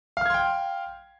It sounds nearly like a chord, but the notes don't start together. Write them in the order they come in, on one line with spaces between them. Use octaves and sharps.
F5 F6 G#6 C6 G5